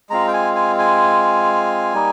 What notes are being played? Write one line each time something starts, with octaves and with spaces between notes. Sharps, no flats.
G#3 C4 F4 A#5
G5
G#5
G#5
G#5
G3 A#3 D#4